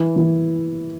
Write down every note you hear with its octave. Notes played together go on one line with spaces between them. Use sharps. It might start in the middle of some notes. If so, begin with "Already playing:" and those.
Already playing: E3 E4
E3